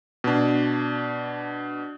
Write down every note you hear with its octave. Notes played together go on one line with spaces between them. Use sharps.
B2 D4